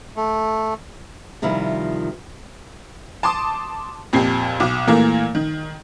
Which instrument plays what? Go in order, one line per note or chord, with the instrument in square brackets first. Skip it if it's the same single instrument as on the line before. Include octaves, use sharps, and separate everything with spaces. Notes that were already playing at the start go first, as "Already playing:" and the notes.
[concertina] A3
[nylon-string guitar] C3 D#3 F3 G3 E4
[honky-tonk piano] A5 C6 D6 D#6
F2 A#2 G4 C7
B1 D6
A#2 E3 A3 A#3
D#3